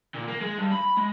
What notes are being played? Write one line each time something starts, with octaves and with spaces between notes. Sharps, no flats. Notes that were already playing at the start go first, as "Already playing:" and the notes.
A#2
A#3
G#3
G2
B5
G#3